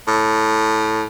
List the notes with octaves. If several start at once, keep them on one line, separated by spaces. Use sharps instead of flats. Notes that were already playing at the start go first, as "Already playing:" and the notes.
A2